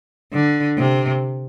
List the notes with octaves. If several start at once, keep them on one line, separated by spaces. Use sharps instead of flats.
D3
C3